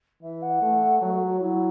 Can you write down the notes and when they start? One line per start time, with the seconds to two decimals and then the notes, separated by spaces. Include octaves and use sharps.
0.22 E3 E5
0.42 F#5
0.62 A3
1.01 F#3 F#5
1.09 A4
1.14 F#4
1.28 F#4
1.40 F#3 E4